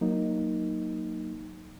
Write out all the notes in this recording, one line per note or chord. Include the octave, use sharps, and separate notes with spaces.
F#3 A#3 D#4